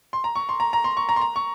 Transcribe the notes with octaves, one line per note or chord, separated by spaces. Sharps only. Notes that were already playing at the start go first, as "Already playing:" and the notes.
C6
A#5
C#6
C6
A#5
A#5
C6
C#6
A#5
C6
A#5
C#6